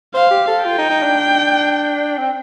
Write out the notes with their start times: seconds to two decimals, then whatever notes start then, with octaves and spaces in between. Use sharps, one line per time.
0.14 C5 F5
0.31 G4
0.48 A4
0.65 F4 G5
0.78 D#4
0.90 D#4
1.03 D4
2.18 C4